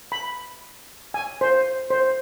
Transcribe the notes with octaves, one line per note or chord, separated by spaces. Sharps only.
B5
G#5
C5
C5